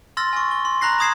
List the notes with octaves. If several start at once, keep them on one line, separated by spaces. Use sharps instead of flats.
C6 E6 F6 A6 A#6
G#5 C#6
G7
C6
A#5 B5 F#6 A#6 C7
A#5 B5 D#6 G#6 C7 E7